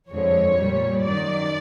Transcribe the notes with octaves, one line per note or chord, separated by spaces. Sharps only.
F2 D3 F3 G#3 C#5
A#2 G3
F#2 D#3 F#3 D5